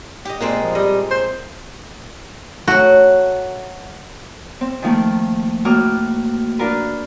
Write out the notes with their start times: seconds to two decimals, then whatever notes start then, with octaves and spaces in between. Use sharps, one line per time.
0.25 G4 D#5
0.41 A#2 G#3 A#3 C4
0.62 F3
0.75 G3 D#5
1.11 C5
2.68 F#3 A3 F#4
4.61 C4
4.82 D#3 F3 A3 A#3
5.65 A2 A#3 F#4 D#5 D6 F6
6.59 D4 F4 F#4 A#4 B4